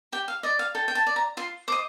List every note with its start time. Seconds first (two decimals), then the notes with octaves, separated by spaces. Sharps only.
0.12 G4 G5
0.28 F5
0.43 D5 D#5
0.59 F5
0.75 A4 G5
0.88 G5
0.95 A5
1.07 D5
1.16 A#5
1.37 F4 C6
1.68 C5 D#5 D6